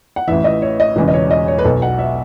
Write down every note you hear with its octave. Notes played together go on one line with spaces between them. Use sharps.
F#5
A1 A2 E3 E5
D#5
C#5
D#5
E1 E2 C#3 B4
D#5
C#5
D#5
C#5
B4
B1 B2 A4
F#5
E5